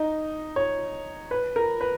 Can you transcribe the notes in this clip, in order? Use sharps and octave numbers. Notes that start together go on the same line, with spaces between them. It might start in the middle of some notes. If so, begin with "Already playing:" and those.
Already playing: D#4
C#5
B4
A#4
B4